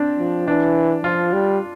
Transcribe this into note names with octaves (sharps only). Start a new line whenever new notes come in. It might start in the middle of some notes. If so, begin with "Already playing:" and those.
Already playing: C4 D4
F3
E3 D4
F3 F4
G3